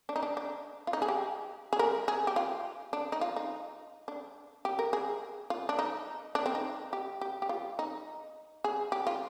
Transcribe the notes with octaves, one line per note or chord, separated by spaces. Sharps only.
D4
D#4
D4
D4
F4
D#4
G#4
G4
G#4
A#4
G#4
G4
F4
D4
D#4
F4
D#4
D4
G4
A#4
G#4
F4
D4
D#4
D4
C4
D#4
G4
G4
G4
F4
D#4
G#4
G4
F4